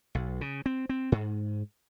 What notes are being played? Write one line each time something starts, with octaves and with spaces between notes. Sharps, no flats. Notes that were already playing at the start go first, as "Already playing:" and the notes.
B1
C#3
C4
C4
G#2